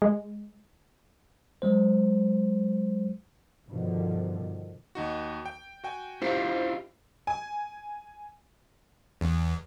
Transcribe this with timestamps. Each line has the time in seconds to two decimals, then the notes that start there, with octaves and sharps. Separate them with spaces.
0.02 G#3
1.62 F#3 G#3 C5
3.69 G2 B2 D3 D#3 F3
4.95 D#2 D#4 F#4
5.46 G5
5.84 F#4 G5 G#5
6.22 E4 F4 G4 C5
7.27 G#5
9.21 E2